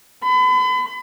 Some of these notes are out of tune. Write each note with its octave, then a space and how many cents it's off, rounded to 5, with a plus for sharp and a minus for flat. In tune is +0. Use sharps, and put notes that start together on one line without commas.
B5 +40